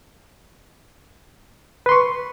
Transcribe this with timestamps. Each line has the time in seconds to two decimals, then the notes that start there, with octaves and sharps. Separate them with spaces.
1.86 B4
1.89 C6
1.92 C#6